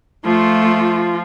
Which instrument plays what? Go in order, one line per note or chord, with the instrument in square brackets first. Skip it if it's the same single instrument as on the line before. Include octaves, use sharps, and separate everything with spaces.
[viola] F3 F4 [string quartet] A3